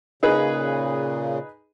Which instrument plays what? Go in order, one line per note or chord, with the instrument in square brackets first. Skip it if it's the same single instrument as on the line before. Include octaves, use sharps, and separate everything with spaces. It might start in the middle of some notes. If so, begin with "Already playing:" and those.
[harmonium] A#2 C#3 [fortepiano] D#4 G#4 B4